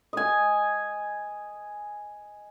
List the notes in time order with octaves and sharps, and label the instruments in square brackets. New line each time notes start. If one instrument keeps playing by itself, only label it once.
[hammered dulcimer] D#5 G#5